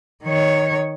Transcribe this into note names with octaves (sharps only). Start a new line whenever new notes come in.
D#3 C#5